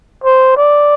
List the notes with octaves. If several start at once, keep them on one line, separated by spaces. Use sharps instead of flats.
C5
D5